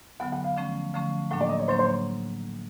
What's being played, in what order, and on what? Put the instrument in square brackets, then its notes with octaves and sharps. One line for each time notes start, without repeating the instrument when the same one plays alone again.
[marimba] D3 F#3 B3 [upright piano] F#5
[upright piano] F#5
F5
[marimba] D3 F3 A3 C#4
D3 F3 A3 C#4
[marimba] A2 F#3 A#3 D4 [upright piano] F#5
[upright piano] D5
D#5
C#5
[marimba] A2 F#3 A#3 D4 [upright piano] C5
[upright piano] C5
C#5